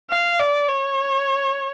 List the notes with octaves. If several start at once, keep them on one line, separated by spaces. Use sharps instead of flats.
F5
D5
C#5